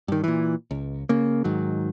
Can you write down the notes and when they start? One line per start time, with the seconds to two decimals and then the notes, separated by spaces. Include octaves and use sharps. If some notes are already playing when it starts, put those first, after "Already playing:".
0.08 G2 D#3
0.24 A#2 E3
0.71 C#2
1.09 C#3 A#3
1.44 G#2 D#3 F#3